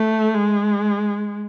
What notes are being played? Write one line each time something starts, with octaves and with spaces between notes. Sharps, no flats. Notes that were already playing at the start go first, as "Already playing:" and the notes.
Already playing: A3
G#3